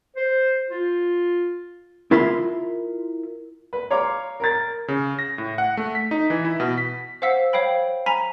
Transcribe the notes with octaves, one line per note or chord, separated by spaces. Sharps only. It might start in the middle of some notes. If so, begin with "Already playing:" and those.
C5
F4
E4 F4 A#4 E5 B5 C6
B4
C#5 F5 A#5 C6 D6
A#4 A#5 A6
C#3
A#6
A2
F#5
A3
B6
D#4
E3
E4
B2
B6
C5 F5 F#5 E6 B6
C5 C#5 F5 G5 B5
G#5 A#5 B5 B6 F7